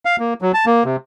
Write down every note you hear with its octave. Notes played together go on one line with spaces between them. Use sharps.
F5
A#3
F#3
A5
A#3
C3